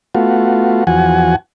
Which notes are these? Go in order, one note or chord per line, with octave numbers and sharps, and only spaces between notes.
A3 B3 F4 F#4
E2 F3 F#4 F#5 G#5